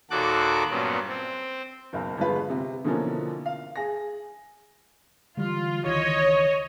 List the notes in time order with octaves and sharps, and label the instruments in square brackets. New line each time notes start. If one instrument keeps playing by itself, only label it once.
[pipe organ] D#2 A#2 F#4 A4 D6 F#6
G2 A#2 F#3 B3 C#4
C4
[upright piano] F#1 B1
G1 E2 G#3 F4 B4
C3
B2 D3 E3 F3 A#3 C#4
F5
G#4 A#6
[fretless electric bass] D3 E3 G3 [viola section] F4
[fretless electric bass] C#2 D#3 E3 [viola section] C#5 D#5